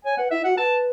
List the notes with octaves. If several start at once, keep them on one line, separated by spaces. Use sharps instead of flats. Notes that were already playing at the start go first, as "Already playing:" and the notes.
C#5 G#5
B4 F#5
E4 E5
F#4 F#5
B4 A5